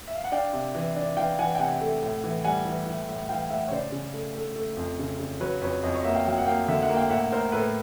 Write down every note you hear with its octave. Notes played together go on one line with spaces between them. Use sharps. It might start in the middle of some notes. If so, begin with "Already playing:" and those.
E5
F5
F#5
D4 F5 G5
C3
E3
D4
E3 F5 G5
E3 F#5 G#5
G5
C3 F#5 G#5
A3
A2
E3
G3 F#5 G#5
E3
E3
A2
E3 F5 G5
A2 E5 F#5
C#5
C#3 C5 D5
C#3
A3
A3
A3
F2
C#3
C#3
F#3 B4 C#5
F2 B4 C#5
F2 C#5 D#5
C#5 D#5
A#3 E5 F#5
F5 G5
F#3 F5 G5
F#5
A#3 F5 G5
D3 E5 F#5
E5 F#5
A#3
F5 G5
A2 E5 F#5
A2 A#4 C5
A2 A4 B4